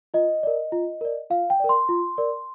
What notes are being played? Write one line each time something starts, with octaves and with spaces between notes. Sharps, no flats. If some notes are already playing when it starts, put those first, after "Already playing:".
F4 D#5
A#4 D5
F4
A#4 D5
F4 F5
G5
A#4 D5
C6
F4
A#4 D5